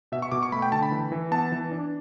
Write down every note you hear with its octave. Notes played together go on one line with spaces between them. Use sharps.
B2 E5
C#6
B2 D6
C#6
A3 B5
G5
D3 A5
B5
E3
E3
B3 A5
E3
D4